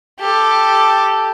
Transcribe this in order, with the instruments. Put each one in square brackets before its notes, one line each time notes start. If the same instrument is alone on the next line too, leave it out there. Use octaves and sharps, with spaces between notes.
[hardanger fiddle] G4 A4